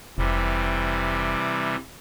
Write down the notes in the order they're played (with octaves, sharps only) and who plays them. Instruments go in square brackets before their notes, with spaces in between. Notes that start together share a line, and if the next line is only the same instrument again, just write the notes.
[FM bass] F1 [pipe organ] C3 E3 G3